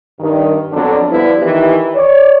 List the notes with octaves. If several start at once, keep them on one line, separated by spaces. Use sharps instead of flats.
G2 D#3
F2 D3 F#3 B3 D4 A4
D3 F3 G3 B3 E4 B4
D#3 E3 G4
C#5 D5